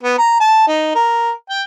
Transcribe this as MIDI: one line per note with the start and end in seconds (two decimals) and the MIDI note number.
0.03 0.16 59
0.18 0.36 82
0.40 0.66 81
0.67 0.91 63
0.95 1.31 70
1.49 1.63 79